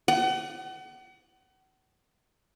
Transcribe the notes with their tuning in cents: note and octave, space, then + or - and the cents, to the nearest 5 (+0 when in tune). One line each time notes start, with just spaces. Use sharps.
F#5 +40